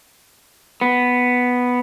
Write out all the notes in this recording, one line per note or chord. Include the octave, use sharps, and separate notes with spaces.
B3